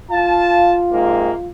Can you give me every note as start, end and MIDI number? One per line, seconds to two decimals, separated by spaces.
0.11 1.51 65
0.11 0.73 77
0.11 0.73 81
0.92 1.32 44
0.92 1.32 48
0.92 1.32 58